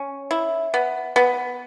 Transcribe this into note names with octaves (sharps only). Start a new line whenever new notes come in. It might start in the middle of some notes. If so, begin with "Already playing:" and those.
Already playing: C#4
E4
B3
B3